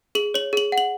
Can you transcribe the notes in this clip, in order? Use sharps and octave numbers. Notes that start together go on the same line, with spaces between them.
G#4 F#7
C#5 F#7
G#4 F#7
F#5
F#7